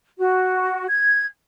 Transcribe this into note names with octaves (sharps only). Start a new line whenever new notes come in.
F#4
G#6